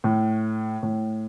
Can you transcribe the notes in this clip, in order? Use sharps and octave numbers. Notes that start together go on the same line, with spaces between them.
A2
A2